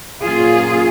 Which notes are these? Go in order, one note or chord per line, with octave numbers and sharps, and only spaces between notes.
A#2 F#3 A#3 C#4 F4 G#4